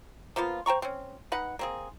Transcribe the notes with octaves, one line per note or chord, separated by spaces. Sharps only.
F3 A#3 B3 F4
C5 G5 A#5 C#6
C4 C#4
D#4 B4 F#5
A#3 C4 G#4